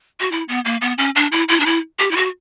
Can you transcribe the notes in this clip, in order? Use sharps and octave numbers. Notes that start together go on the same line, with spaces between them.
F#4
E4
B3
A#3
B3
C#4
D4
E4
E4
D4
E4
G4
E4
F#4